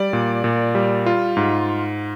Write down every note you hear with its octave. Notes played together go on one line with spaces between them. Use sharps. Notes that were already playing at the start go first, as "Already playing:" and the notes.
Already playing: G3 D5
A#2
A#2
G3
F4
G#2